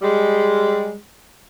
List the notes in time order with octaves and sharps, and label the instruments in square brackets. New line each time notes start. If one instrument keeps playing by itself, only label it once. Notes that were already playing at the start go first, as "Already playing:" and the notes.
[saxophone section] G3 G#3